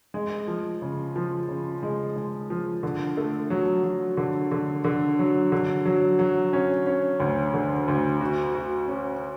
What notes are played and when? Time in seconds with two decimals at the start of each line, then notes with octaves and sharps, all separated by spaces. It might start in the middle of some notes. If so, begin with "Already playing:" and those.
0.14 G#3
0.48 F3
0.82 C#3
1.16 F3
1.49 C#3
1.83 G#3
2.16 G#3
2.50 F3
2.83 D3
3.17 A3
3.50 F#3
3.84 F#3
4.17 D3
4.52 D3
4.84 D3
5.19 F#3
5.52 D3
5.86 F#3
6.19 F#3
6.53 C#4
6.86 C#4
7.20 D2
7.54 D3
7.88 D2
8.21 F#4
8.54 F#4
8.88 C#4